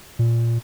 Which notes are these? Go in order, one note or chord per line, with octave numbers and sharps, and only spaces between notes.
A#2